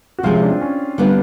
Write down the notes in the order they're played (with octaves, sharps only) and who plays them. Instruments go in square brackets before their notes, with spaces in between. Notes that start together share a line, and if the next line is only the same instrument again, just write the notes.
[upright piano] F#4
[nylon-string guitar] C3 F3 G#3 C#4 [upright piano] F4
[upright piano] E4
D4
C4
C#4
[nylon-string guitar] D3 G3 B3 D4 F4